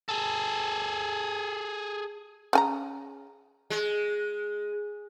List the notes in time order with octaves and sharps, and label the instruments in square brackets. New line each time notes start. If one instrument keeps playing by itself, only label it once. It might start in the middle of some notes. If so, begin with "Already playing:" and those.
[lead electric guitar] G#4 A4
[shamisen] C#3 G#5 A#5
[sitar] G#3